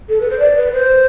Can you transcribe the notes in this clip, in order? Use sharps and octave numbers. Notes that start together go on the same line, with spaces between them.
A4
B4
C5
D5
B4
C5